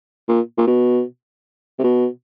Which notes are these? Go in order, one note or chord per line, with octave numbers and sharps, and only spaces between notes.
A#2
A#2
B2
C3
B2